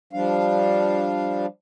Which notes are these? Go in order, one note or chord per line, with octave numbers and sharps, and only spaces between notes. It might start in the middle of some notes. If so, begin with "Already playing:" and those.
F3 G3 D4 F5